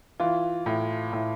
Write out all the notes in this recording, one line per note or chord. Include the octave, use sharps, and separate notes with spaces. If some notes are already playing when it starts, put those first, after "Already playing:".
E3 F4
A2
A2